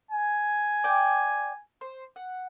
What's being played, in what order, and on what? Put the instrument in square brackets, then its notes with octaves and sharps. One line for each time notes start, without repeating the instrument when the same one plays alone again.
[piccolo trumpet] G#5
[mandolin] D5 G5
C5
F#5